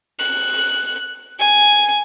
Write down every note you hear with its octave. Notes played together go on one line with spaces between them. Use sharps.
F#6
G#5